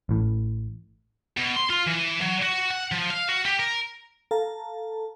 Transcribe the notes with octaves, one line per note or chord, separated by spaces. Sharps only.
A1 A2
B2
C6
F4
E3
F#3
F#4
F#5
F3
F5
F#4
G4
A#4
A4 F5 A5 A#5